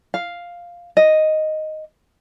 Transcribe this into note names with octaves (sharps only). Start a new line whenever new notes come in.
F5
D#5